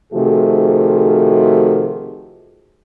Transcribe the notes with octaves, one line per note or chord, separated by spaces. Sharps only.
C3 D#3 F3 A3 F#4 G#4